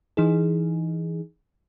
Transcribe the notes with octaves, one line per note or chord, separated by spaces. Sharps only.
E3 D#4 G#4